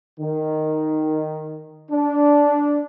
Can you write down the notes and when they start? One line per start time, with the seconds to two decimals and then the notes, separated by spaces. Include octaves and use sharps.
0.20 D#3
1.91 D4